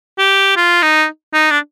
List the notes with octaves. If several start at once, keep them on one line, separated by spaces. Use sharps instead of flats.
G4
F4
D#4
D#4
D4